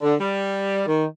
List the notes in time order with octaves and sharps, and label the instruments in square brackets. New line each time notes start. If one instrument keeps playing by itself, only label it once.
[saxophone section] D3
G3
D#3